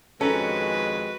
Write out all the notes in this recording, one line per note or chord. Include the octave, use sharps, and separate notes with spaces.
F2 D#3 G#3 C#4 F#4 A4 B4 A#5